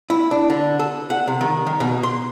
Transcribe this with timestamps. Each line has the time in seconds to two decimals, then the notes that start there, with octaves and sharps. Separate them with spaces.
0.10 E4
0.31 D4
0.50 D3
0.79 A4
1.10 F#5
1.27 C3
1.41 D#3
1.67 D#3
1.80 B2
2.03 C6